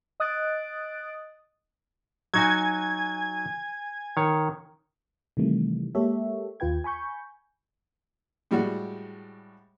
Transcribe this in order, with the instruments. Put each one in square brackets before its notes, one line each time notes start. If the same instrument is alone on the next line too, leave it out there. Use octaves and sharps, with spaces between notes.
[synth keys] D#5 D#6 F#6 A6 D7
[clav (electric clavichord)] F#3 D#4 F#4 [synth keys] G#5 G#6
[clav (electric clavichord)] D#3 C#5
[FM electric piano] C3 D#3 E3 G3 A3
G#3 A#3 G4 A4 C#5 E5
D#2 F4 B4 G5 G#6
G#5 B5 C#6 G6
[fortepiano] A2 G3 G#3 F#4